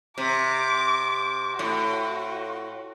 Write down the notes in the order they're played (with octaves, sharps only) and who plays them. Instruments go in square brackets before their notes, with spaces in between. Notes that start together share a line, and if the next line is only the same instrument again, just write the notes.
[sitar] C3 [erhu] D6
[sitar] A2 [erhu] F#4